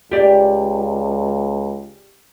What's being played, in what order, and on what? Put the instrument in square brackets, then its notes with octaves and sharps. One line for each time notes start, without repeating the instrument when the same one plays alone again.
[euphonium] C#2 [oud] G4 D5